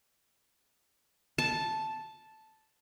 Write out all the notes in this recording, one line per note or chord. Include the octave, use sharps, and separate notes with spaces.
A5